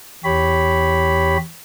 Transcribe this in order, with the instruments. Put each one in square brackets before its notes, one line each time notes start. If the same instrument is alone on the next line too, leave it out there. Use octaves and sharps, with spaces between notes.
[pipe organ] E2 G4 C#5 B5